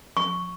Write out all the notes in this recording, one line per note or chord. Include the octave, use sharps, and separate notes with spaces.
C#6